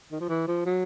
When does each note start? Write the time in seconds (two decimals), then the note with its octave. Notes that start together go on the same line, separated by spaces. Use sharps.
0.11 D#3
0.20 F3
0.29 E3
0.48 F3
0.65 F#3